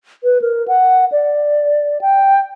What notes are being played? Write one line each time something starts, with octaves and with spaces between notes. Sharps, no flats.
B4
A#4
F#5
D5
G5